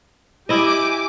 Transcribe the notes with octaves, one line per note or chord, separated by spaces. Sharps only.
E4 G4 D#5 G#5 D6